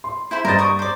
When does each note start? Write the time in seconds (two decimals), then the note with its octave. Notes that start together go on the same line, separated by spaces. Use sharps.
0.04 C6
0.31 E4 C5 B5
0.45 G2 A#4 C5 D#5 B5 A6
0.59 A#4 C#6 D#6
0.79 C5 D5